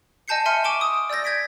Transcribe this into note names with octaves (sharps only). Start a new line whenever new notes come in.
D#5 G#5 A5 G6 C7 C#7
E5 G#5 C6 F6 C#7
G#5 C#6 D6 D7 E7 G7
D#6
D5 E6 G6 A6 A#6
G6 G#6 A#6 B6 D7